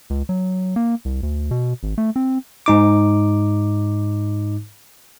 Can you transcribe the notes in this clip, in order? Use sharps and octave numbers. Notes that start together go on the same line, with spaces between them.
C#2
F#3
A#3
C2
D2
B2
G#1
A3
C4
G#2 D#4 D6